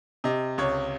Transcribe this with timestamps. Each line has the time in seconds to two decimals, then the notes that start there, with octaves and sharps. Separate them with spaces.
0.24 C3 D#5
0.58 C#2 C#5